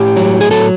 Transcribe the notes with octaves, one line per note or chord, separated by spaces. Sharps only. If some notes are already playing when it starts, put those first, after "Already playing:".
Already playing: A2 G4
F#3
G#4
F#3 A4